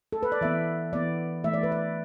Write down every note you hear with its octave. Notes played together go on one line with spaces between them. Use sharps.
A4
B4
D5
E3 B3 E5
E3 B3 D5
E3 A3 E5
D5
B4
D5